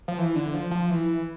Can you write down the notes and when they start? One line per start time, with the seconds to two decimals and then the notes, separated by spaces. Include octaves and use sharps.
0.08 F3
0.18 E3
0.36 D3
0.54 F3
0.71 F3
0.90 E3